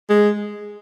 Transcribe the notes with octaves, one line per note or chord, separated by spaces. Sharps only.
G#3